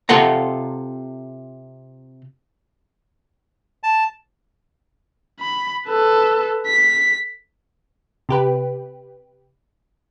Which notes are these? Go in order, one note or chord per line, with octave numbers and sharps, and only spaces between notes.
C3 F4 A4 F#5 A#5
A5
B5
A4 B4
B6
C3 G4 B4